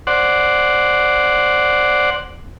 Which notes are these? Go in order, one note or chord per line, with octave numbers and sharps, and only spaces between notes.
C5 D5 F#5